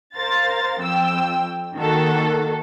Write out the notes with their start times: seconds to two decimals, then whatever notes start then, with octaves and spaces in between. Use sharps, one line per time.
0.16 A#4 C5 F5 A6
0.80 F2 F3 G5 E6
1.76 D#3 A#3 F#4 A4